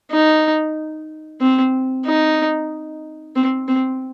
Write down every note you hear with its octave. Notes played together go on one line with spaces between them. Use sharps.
D#4
C4
D#4
C4
C4